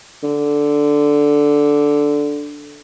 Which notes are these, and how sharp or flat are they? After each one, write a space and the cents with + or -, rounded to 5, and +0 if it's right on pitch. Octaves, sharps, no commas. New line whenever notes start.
D3 -5